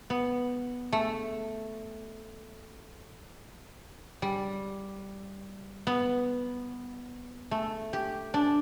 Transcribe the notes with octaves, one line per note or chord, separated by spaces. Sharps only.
B3
A3
G3
B3
A3
G4
D4